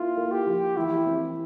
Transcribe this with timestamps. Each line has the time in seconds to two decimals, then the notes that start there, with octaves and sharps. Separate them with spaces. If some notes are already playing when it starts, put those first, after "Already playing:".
Already playing: A#3 E4 F4
0.17 A#3
0.32 G4
0.47 F3
0.77 E3 E4
1.06 C4